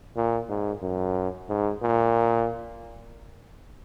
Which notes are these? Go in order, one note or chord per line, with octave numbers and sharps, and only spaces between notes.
A#2
G#2
F#2
G#2
A#2